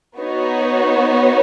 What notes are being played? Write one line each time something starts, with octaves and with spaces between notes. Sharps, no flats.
B3 D#4 F#4 C#5